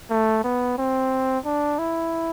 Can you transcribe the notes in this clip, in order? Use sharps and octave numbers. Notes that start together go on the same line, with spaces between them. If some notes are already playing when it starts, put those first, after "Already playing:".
A3
B3
C4
D4
E4